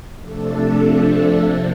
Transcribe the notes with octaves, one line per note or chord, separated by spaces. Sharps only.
C3 F3 A3 D4 A4
C3 F3 A#3